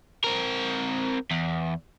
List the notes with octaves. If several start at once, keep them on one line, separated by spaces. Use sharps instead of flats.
C4 A#4
E2